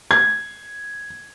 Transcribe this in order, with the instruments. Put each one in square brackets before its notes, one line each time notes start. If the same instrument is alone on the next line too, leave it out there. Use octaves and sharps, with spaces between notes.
[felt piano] G#6